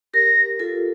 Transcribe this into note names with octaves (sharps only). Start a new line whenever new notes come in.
G4 A#4 A#6
F4 A4